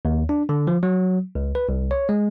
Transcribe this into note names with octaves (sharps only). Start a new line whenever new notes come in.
D#2
D4
D3
F3
F#3
C#2
B4
C2
C#5
G#3